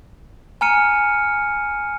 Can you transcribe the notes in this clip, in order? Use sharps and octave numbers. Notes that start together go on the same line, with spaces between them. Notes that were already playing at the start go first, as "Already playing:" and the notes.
G#5 A#5 F6 C#7 D#7